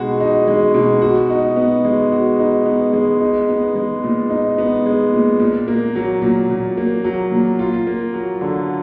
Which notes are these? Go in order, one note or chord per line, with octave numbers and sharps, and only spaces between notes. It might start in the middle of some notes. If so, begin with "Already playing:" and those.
Already playing: B2 G#3 D#4 F#4
D#4
G#3
B2
F#4
D#4
B3
G#3
F#4
D#4
B3
G#3
D#4
B3
G#3
A#2
D#4
B3
G#3
A#2
A#2
A#3
F#3
A#2
A#2
A#3
F#3
A#2
F4
A#3
F#3
D3